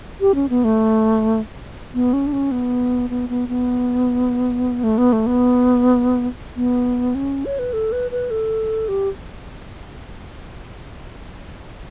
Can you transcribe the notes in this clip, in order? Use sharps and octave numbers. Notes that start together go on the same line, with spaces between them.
G4
C#4
B3
A3
B3
C#4
D4
C#4
B3
B3
B3
B3
A3
B3
A3
B3
B3
C#4
C#5
B4
A4
B4
B4
A4
G4